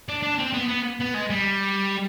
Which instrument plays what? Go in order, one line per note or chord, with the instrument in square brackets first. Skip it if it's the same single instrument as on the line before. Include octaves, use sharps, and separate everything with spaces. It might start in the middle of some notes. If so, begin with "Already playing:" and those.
[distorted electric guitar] D4
D4
C4
B3
B3
B3
G#3
G3